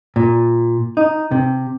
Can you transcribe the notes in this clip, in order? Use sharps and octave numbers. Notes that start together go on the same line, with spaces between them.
A#2
D#4
C3